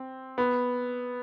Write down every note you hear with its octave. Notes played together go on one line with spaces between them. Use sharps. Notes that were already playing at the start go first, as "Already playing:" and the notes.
Already playing: C4
B3